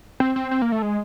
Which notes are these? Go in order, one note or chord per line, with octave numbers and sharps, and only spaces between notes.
C4
C4
C4
A#3
A3
G#3